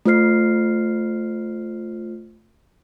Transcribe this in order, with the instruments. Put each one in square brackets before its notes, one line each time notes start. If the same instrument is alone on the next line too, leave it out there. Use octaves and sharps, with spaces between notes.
[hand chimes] A3 F4 C5 F6 C7